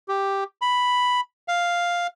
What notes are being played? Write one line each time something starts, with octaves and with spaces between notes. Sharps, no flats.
G4
B5
F5